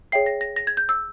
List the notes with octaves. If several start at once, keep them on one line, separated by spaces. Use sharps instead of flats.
G#4 C#5 E5 G5 C7
A#6
A#6
A#6
G#6
G6
E6